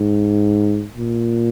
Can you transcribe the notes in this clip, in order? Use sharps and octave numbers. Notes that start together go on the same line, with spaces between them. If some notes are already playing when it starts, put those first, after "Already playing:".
Already playing: G#2
A#2